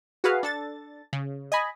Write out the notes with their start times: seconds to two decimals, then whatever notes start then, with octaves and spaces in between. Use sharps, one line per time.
0.24 F#4 G#4 B4 F5
0.43 D4 A4 A6
1.13 C#3
1.52 D#5 G#5 B5